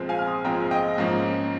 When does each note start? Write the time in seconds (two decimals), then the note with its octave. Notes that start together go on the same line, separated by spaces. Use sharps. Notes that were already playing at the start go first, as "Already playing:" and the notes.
Already playing: A#1 A#2 G#3 C4
0.09 F5 G#5
0.19 F6
0.27 C6 D#6
0.45 A#1 A#2 G#3 C4 G5 A#5
0.71 D#5 G5
0.98 G#2 F3 A#3 C#4